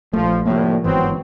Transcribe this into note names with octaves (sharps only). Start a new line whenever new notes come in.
A#1 F3 A3
C2 A2 F3 G3 A#3
G1 G#2 E3 F#3 B3 C4